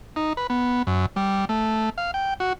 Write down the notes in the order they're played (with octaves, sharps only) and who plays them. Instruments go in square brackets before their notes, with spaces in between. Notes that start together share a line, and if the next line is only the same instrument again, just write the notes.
[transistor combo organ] D#4
B4
B3
F#2
G3
A3
F5
G5
F#4